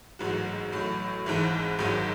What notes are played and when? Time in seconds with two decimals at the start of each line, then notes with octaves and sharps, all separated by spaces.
0.19 A1 G#2 F#3 F#4
0.72 A1 A2 F#3
1.26 G#1 G#2 E3
1.79 G#1 G#2 D#3 F#3